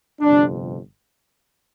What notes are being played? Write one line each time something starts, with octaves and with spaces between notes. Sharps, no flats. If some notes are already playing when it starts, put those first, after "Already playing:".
G1 F2 C3 D4